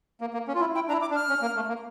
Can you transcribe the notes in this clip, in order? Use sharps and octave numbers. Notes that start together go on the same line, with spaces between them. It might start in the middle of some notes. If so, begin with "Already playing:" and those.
A#3
A#3
C#4
F4
E4
E4 G5
D4 A#5
E4
D6
D4
F6
C#4
A#3
A3
A#3